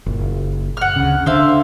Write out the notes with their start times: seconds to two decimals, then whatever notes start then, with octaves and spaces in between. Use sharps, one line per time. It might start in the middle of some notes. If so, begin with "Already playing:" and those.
0.06 F#1 A#2
0.77 F#5 F6
0.96 D2 C#3
1.26 D3 C5 E5 F5